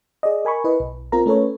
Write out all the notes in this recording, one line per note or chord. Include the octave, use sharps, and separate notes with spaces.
G#4 D5 D#5
A#4 G#5 B5 C#6
E4 B4 D#5
B1
C4 F4 A#4 A#5
A3 C#4 A4 B4 C#5